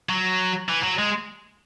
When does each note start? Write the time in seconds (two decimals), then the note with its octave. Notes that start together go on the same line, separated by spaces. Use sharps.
0.09 F#3
0.69 E3
0.84 F#3
0.99 G#3